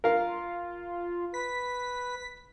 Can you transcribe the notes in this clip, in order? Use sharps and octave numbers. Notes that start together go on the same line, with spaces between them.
F4 A#4 F5
B4 B6